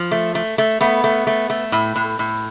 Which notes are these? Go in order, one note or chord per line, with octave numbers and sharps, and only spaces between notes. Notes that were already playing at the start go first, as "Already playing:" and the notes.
Already playing: F3
A3
A3
A3
A3 B3
A3
A3
A3
A2
A2
A2